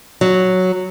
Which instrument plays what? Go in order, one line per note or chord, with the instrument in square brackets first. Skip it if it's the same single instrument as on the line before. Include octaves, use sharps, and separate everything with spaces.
[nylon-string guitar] F#3